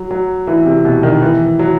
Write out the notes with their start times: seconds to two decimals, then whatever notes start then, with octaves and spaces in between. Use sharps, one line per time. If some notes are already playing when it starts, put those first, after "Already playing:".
Already playing: F#3
0.11 F#3
0.47 E3
0.66 C3
0.85 B2
1.03 D#3
1.22 E3
1.59 F#3